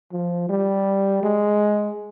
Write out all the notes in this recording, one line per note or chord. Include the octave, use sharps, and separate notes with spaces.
F3
G3
G#3